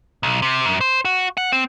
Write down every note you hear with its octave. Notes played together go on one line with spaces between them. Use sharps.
B1
C3
F#2
C5
F#4
F#5
C4